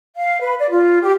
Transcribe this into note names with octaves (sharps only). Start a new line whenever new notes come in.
F5
B4
D5
F4
G4